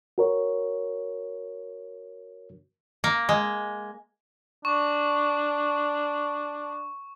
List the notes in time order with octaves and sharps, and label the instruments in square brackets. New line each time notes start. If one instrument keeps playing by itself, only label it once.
[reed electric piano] F#4 A#4 C#5
[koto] A#3
G#3
[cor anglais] D4 [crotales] C#6